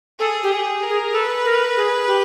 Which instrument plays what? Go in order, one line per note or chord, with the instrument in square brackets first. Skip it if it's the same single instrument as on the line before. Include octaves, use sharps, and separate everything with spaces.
[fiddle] G#4 [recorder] A4
[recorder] G4
[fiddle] G#4
A#4
[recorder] G#4
[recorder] A4 [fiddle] B4
[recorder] A#4
G#4
G4